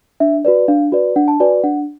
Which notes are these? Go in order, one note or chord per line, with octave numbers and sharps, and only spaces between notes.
D4 E5
F#4 B4 D5
D4 F5
F#4 B4 D5
D4 F#5
A5
F#4 B4 D5 G#5
D4 F#5